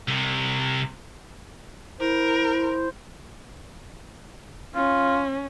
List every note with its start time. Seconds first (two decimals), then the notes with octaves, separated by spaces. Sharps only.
0.08 C2 C3
2.00 E4 A#4 C5
4.75 C#4 F4